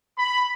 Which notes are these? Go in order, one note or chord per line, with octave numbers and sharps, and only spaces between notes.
B5